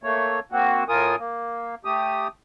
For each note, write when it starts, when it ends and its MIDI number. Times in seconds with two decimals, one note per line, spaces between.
0.03 0.40 57
0.03 0.40 58
0.03 0.40 73
0.52 0.84 58
0.52 0.84 60
0.52 0.84 66
0.89 1.16 45
0.89 1.16 65
0.89 1.16 70
0.89 1.16 80
0.89 1.16 87
1.19 1.75 58
1.85 2.28 57
1.85 2.28 67
1.85 2.28 87